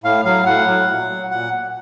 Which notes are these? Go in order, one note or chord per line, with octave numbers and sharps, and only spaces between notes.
A2 F5
F#3 F5
A2 F#5
F#3
A#2
F#3
A#2 F#5